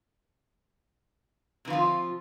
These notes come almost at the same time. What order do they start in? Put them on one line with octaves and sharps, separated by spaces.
C3 E3 F4 F3